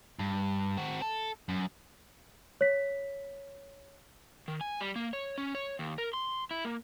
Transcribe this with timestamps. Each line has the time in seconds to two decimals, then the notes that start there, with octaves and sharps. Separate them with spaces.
0.19 G2
0.77 C4 F#4
1.02 A4
1.49 F#2
2.61 C#5 B6
4.48 D#3
4.61 G#5
4.81 G3
4.96 A#3
5.13 C#5
5.38 C#4
5.55 C#5
5.79 D#2
5.98 A#4
6.14 C6
6.51 E4
6.65 A#3